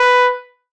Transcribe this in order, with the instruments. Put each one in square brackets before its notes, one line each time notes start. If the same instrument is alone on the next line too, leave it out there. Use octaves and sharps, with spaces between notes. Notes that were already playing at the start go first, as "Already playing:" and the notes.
Already playing: [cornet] B4